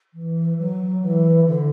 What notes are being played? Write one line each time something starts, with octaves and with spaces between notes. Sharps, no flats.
E3
F#3
E3
D3